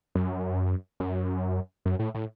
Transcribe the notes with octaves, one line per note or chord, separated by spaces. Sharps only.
F#2
F#2
F#2
A2
A2